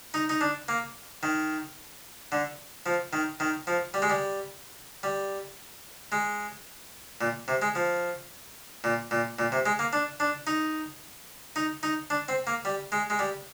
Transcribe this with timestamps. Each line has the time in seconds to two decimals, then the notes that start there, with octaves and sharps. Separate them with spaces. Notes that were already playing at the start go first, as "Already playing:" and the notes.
0.14 D#4
0.29 D#4
0.41 D4
0.68 A#3
1.23 D#3
2.32 D3
2.86 F3
3.13 D#3
3.40 D#3
3.67 F3
3.94 G3
4.02 G#3
4.10 G3
5.03 G3
6.12 G#3
7.21 A#2
7.48 C3
7.62 G#3
7.75 F3
8.84 A#2
9.11 A#2
9.39 A#2
9.52 C3
9.66 G#3
9.79 A#3
9.93 D4
10.20 D4
10.47 D#4
11.56 D#4
11.83 D#4
12.10 D4
12.28 C4
12.47 A#3
12.65 G3
12.92 G#3
13.10 G#3
13.19 G3